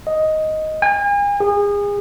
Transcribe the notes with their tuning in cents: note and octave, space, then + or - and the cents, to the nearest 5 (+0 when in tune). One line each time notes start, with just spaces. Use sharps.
D#5 +5
G#5 -40
G#4 -30